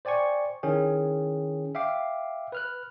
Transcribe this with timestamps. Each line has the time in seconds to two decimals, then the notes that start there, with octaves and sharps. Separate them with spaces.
0.05 C5 D5 G5 G#5 C#6
0.63 D#3 C#4 E4 G#4 G5
1.75 E5 F5 G5 D6 C7
2.52 B4 F6 F#6